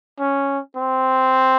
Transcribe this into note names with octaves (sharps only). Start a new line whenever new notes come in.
C#4
C4